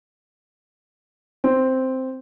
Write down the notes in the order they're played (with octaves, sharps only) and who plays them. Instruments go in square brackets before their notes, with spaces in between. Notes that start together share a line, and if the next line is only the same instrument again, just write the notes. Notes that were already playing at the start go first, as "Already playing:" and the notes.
[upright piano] C4